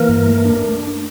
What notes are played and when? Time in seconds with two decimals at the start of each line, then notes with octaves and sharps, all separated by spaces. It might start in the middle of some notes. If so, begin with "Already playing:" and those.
Already playing: E3 A#3 A#4
0.09 G2
0.27 A3
0.45 D4